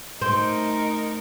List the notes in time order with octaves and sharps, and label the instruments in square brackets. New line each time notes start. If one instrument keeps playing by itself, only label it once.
[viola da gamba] A3 D#4 A#4 [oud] C4